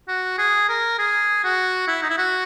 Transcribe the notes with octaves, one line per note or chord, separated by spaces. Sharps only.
F#4
G#4
A#4
G#4
F#4
E4
D#4
E4
F#4